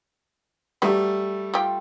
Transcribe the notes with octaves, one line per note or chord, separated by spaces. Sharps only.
F#3 G3 A3 B3
F4 G4